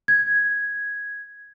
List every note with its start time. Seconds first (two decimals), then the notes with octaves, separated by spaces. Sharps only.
0.08 G#6